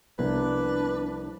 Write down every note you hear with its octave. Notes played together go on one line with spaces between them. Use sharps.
C2 F3 B3 C4 D4 B4